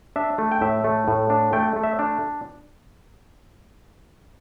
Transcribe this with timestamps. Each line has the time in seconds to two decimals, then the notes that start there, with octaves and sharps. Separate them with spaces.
0.16 D4 E5
0.38 A3
0.52 G5
0.61 A2 E5
0.84 A3
1.08 A2
1.30 D4
1.53 A3 G5
1.76 A3
1.83 E5
1.99 D4